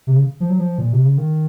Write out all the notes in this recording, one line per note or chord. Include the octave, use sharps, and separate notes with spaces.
C3
C#3
F3
F#3
F3
A#2
C3
C#3
D#3